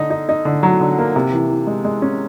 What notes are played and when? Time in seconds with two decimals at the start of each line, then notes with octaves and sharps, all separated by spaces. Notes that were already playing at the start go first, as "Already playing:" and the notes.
Already playing: D3 D#4
0.10 D#4
0.29 D#4
0.45 D3
0.63 F#3
0.81 D3
0.98 A#3
1.16 C3
1.32 E3
1.50 E3
1.67 G#3
1.85 G#3
2.02 C#4